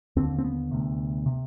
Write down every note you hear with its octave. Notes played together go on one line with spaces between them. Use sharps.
D#2 D3 C4
C4
B3
D2 C3
C3